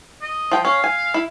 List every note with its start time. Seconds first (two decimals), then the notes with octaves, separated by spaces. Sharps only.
0.22 D#5
0.51 F3 G5
0.65 C#4 F5
0.84 G#5
1.14 E4